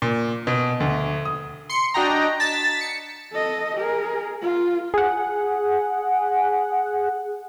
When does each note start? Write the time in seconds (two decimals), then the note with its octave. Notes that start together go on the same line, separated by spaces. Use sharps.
0.02 A#2
0.47 B2
0.80 D2
1.25 D#6
1.69 C6 C#7
1.94 D4 F#4 D#5 G5 A#5
2.40 A5 A6 B6
2.81 C#7
3.33 A4 D#5
3.77 G#4 A#4
4.42 F4
4.94 G#4 F#5